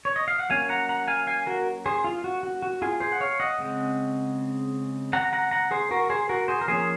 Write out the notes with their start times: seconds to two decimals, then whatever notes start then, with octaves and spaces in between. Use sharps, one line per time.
0.05 C#5
0.16 D#5
0.28 F5
0.39 F#5
0.49 F#3 A#3 C#4 F5 G#5
0.69 F#5 A#5
0.89 F#5 A#5
1.08 F5 G#5
1.27 F5 G#5
1.47 F#4 A#4
1.86 G#4 C5
2.04 F4
2.24 F#4
2.43 F#4
2.62 F#4
2.82 F4 G#4
3.00 G#4 C5
3.12 F#5
3.20 C#5 F5
3.40 D#5 F#5
3.58 C#3 G#3 C4
5.13 F#5 A#5
5.33 F#5 A#5
5.51 F#5 A#5
5.71 G#4 C5
5.91 F#4 A#4
6.10 G#4 C5
6.29 F#4 A#4
6.48 G#4 C5
6.61 A#4
6.68 F3 A#3 C#4 G#4 C5